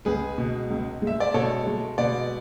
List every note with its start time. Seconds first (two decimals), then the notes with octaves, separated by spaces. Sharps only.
0.05 C#2 G#4 B4
0.38 B2
0.70 C#2
1.02 G#3
1.07 E5
1.20 D5
1.34 B2 A4 C#5
1.67 G#3
1.98 B2 B4 D5